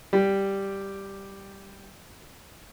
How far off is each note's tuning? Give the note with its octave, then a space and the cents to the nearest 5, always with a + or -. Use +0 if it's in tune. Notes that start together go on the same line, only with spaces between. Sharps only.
G3 +0 G4 +0